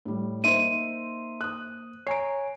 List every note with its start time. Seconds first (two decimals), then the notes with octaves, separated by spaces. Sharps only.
0.05 A2 G3
0.44 A#3 D#4 C5 E5 C6 D#7
1.41 D#6 F#6
2.07 C#5 G#5 A#5 C7 D7